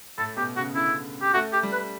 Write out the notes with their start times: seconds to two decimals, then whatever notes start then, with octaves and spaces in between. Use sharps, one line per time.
0.18 A2 A4
0.37 B2 G4
0.57 C#3 F#4
0.75 D3 E4
1.22 G4
1.34 A3 F#4
1.53 G4
1.63 G3
1.72 B4